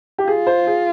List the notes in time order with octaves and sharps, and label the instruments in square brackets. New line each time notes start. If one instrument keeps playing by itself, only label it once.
[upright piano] G4
[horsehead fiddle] F4 [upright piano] G#4
[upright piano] C5
G#4